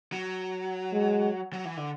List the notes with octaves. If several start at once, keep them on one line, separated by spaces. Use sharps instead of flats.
F#3
G#3
F#3
E3
D3